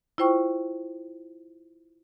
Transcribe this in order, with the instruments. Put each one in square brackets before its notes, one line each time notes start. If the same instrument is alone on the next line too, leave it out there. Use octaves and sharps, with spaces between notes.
[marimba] E4 F4 C5 G5 C#6